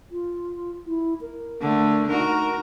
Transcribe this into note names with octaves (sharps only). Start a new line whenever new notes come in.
F4
E4
A#4
D3 A3
D#4 F#4 A#4